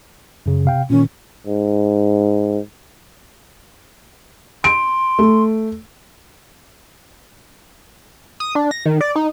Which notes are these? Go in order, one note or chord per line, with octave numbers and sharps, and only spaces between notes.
F#2 C#3
C3 F5 G5
A#2 D#3 C#4
G#2
C6 D7
A3
D#6
D4
A#6
D#3
D5
D#4